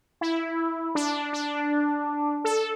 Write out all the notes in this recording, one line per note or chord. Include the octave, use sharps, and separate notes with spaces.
E4
D4
D4
A4